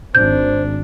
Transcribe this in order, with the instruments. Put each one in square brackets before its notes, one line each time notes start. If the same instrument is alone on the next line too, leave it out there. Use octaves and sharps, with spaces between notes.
[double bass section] G#1 [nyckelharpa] D4 [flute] C5 [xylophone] G6